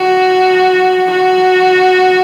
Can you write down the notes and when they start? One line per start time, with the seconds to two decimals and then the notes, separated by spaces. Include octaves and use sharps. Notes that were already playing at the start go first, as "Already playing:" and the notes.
Already playing: F#4
1.11 F#4